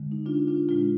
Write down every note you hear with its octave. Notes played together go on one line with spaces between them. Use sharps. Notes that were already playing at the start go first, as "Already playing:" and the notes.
Already playing: D3 G#3
D#4
D4 F4
D4 F4
A#2 G#3 D4 F4